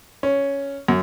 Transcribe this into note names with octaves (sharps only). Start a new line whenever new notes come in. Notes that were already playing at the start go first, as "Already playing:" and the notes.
C#4
F#2